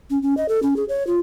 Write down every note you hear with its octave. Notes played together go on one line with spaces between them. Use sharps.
C#4
C#4
D#5
A4
C#4
G#4
C#5
F4